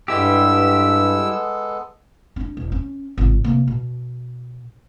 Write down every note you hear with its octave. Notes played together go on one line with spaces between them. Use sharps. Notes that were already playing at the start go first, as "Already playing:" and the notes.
G2 G3 G#3 B3 E4 G4 A4 E6
C#4 D4
E1
C#4
G#1 C#2
C3 A#3
B2